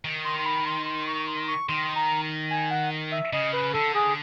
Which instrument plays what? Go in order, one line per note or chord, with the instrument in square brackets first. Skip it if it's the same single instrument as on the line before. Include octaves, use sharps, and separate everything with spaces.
[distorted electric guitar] D#3
[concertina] C6
C6
B5
C6
C6
C#6
C6
C#6
[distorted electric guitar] D#3 [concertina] C6
[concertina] A#5
G#5
F#5
E5
[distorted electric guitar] C#3 [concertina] D#5
[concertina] B4
[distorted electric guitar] D3 [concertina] A4
[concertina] G#4